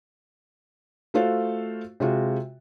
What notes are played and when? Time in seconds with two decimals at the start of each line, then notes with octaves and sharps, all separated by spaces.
1.14 A3 F4 F#4 A4 C5 F5
2.00 C3 G#3 F4 F#4